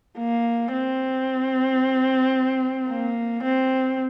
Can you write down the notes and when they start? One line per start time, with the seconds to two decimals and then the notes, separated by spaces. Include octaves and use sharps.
0.18 A#3
0.73 C4
2.89 A#3
3.43 C4